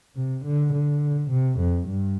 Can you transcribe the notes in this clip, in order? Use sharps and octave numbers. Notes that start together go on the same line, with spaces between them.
C3
D3
D3
C3
F2
G2